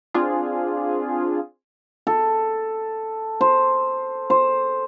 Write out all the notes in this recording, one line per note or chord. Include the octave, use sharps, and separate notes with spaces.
C4 D4 F4 G#4
A4
C5
C5